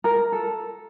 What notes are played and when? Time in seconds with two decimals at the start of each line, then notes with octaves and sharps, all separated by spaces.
0.04 A#4
0.32 A4